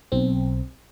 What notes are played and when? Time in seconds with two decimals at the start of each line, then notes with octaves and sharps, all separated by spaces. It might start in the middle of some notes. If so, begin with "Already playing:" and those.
0.12 B1 C4